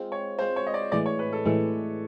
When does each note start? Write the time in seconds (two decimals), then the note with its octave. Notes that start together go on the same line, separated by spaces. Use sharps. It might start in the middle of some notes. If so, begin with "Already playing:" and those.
Already playing: G#3 C4 F4
0.12 C#5
0.38 G#3 C4 F4 C5
0.56 C#5
0.66 D#5
0.74 D5
0.92 A2 E3 G#3 D5
1.06 C#5
1.19 B4
1.32 A4
1.45 A2 E3 G#3 A4